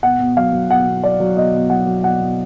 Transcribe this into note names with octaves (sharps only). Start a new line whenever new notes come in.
B2 F#5
B2
F#3 F5
F#3
B2 F#5
B2
F#3 D5
F#3
B2 D#5
B2
F#3 F#5
F#3
B2 F#5
B2